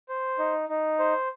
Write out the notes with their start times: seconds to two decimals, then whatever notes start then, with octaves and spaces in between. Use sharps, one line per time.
0.09 C5
0.39 D#4
0.69 D#4
0.99 C5